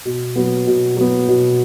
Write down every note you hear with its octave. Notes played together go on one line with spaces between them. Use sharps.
B2
F#3 B3
B2
F#3 B3
B2